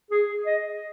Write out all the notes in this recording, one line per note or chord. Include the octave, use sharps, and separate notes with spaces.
G#4
D#5